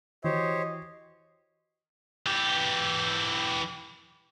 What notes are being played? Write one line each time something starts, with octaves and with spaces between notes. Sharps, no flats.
E3 F#4 G4 C5 C#5 D#5
E3 G4